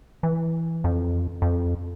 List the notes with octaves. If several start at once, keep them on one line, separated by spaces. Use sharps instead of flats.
E3
F2
F2